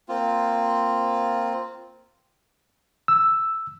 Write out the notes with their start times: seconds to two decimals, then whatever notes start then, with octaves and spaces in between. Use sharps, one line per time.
0.09 A#3 C4 F4
3.08 E6